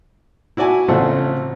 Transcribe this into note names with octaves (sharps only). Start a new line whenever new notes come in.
E4 F#4 D5 G#5 A5
A1 C#3 F3 A3 C4 F#5